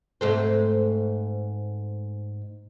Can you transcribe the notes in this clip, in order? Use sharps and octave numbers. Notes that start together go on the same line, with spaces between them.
G#2 A3 C4